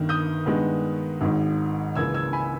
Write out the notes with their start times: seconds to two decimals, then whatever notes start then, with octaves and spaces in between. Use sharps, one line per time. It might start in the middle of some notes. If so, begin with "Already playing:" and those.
Already playing: G1 G2 D#3
0.09 D#6 G6
0.46 G2 D#3 G#3 B3
1.21 G#1 G#2 D#3
1.95 C#2 C#3 E3 A#3 E6 G#6
2.14 E6 G#6
2.33 G#5 B5